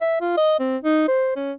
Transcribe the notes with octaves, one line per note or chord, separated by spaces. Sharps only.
E5
F4
D#5
C4
D#4
C5
C#4